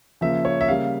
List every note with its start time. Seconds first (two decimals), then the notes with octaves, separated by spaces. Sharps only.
0.21 C#3 F3 A#3 E5
0.45 C#5
0.61 E5
0.68 C#3 G3 A#3 F5